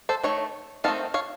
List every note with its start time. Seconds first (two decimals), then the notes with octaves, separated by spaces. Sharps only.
0.09 A4 C5
0.24 D#3 A3 C#5
0.84 D#3 A3 C4 D#4 F5 A5
1.14 C#5 F5